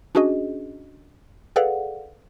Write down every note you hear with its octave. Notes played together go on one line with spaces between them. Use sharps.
C#4 D4 F#4 G#4 D#5
G#4 A4 B4 D5 F5 F#5